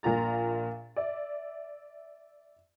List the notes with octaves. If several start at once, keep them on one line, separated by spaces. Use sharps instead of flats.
A#1 A#2 F4 A#5 A6
D5 E5